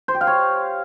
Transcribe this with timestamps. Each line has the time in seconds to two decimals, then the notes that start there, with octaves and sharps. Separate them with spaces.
0.08 C5
0.15 G4
0.21 F5
0.27 C#5